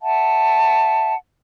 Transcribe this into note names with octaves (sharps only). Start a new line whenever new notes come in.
E5 F#5 A5